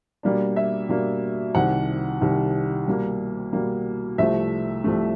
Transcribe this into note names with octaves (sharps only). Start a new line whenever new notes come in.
B2 G3 A#3 D4
E5
B2 G3 A#3 D4
C2 C3 D#3 F#5
C2 C3 D#3
B2 G3 A#3
B2 G3 A#3
C2 C3 F3 A3 E5
C2 C3 F3 A3